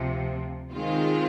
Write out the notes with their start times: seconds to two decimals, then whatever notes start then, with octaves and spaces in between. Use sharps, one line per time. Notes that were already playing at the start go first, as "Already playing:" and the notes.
Already playing: D2 C3 F3
0.73 D#3 G#3 C4 F4